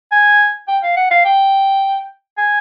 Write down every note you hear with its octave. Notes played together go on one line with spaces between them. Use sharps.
G#5
G5
F5
F#5
F5
G5
G#5